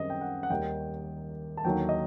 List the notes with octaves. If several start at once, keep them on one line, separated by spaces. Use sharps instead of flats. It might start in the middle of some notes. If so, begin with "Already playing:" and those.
Already playing: F#2 D#3 G3 C4 D#5
G5
F#5
F#5
D#2 D#3 G3 G5
A5
D#2 D3 F#3 A#3 D#4 G5
D#5